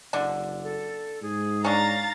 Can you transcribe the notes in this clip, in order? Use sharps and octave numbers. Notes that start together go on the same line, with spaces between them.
F#1 D3 D4
A4
G#2 G#4
C#4 D4 F5 A#5 A6